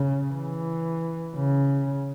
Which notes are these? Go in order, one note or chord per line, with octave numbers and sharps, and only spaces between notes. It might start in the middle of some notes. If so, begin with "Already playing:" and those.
Already playing: C#3
E3
C#3